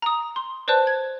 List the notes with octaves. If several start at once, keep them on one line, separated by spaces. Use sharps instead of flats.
A#5 D#6
C6
B4 C5 D5 A5 F#6
G#6